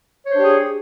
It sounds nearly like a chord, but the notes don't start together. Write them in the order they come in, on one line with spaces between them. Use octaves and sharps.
C#5 C5 D4 G4 G#4